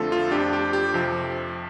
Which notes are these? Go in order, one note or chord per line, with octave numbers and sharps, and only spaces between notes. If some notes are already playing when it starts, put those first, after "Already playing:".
Already playing: F2 D3 F3 A3 C4 F4 A4
F4
F2 F3 D4 G4
G4
G4
F2 C3 F3